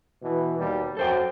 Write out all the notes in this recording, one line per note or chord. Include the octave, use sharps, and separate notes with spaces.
B2 E3
D#2 B2 G3
F#2 A4 C5 G5